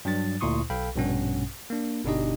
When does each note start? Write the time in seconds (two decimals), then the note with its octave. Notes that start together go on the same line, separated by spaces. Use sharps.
0.05 G2 F#3 D4 A6
0.41 D2 A#2 E4 C6 C#6 D#6
0.70 B1 A4 F5 G5 B5
0.96 A#1 G2 B2 C#4 F#5
1.70 A#3 D4
2.04 G1 B2 D4 D#4 G4 D#5